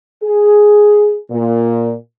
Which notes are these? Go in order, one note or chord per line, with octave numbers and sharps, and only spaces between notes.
G#4
A#2